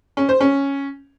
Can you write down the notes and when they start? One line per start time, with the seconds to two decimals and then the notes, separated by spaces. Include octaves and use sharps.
0.17 C#4
0.29 C5
0.40 C#4